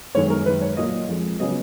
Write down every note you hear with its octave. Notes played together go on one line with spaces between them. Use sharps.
F#2 D#3 G#3 B3 C#5
A#4
F#2 D#3 G#3 B4
C#5
A#2 F#3 A#3 D#5
F2 F3 G#3
C#3 F#3 B3 D#5